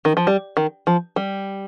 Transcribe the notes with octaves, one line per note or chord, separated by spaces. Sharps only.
D#3
F3
G3
D#3
F3
G3